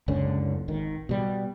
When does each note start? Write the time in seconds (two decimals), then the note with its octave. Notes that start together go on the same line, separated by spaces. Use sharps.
0.08 F#1 C#2 D3 C#4
0.68 G#1 D#3
1.09 B2 G3